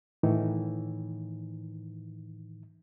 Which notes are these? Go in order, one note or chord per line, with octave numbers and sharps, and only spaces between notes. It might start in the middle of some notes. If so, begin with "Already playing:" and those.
A2 D#3 E3 D#4